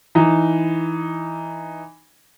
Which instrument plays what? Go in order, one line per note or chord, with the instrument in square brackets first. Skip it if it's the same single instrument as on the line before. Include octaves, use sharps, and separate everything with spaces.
[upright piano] E3 D#4